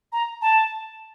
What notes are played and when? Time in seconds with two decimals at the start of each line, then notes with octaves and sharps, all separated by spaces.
0.12 A#5
0.42 A5